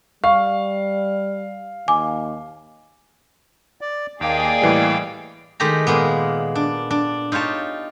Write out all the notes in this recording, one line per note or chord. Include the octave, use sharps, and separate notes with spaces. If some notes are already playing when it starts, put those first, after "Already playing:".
G3 F5 C#6
D#2 G#5 D6
D5
D#2 A#3 G#4 D5 D#5 F5 G5
A2 E3 G3
D#3 G#3 A3 G4 A5 A#5
A#2 G#3 A#3 B3
D4
D4
D#4 F4 G4 C#5 A5